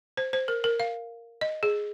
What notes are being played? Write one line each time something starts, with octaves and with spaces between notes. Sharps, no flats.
C5
C5
A#4
A#4
F5
D#5
G#4